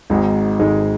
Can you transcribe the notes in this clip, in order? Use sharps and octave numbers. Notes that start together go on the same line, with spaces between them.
G#1 G#2 G#3 D#4
G#1 G#2 G#3 D#4